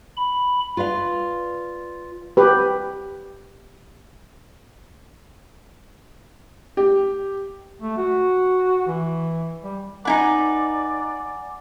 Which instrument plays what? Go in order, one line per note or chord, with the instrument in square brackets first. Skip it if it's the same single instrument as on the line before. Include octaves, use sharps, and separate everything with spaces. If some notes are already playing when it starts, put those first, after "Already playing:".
[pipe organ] B5
[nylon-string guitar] F4 B4 D5 F5
[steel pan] G4 B4
[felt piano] G4
[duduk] A3
F#4
E3
G3
[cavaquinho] D#4 E4 B4 [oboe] D5 [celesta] F#5 G#5 A#5